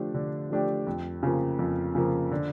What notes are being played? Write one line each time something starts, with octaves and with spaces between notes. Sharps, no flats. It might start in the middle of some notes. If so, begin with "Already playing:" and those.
Already playing: D3 F3 A3 D4 G4
D3
F3 A3 D4 G4
F2
C#3 F3 A#3
F2
C#3 F3 A#3
D3